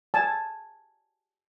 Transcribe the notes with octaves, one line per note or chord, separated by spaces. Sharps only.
G#5 A5